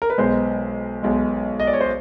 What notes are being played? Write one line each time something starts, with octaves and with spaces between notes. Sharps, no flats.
A#4
B4
B1 B2 G#3 C5
B1 B2 G#3
D#5
D5
C#5
C5